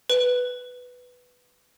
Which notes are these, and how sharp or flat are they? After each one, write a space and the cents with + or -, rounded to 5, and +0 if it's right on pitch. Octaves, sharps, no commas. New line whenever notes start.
B4 +5